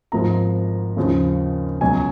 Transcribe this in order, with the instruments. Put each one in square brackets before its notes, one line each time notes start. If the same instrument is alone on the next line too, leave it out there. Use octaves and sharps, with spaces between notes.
[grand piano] G#1 G#2 F3 A#5
D#2 C#3 F3
C#2 B2 F#3 G#5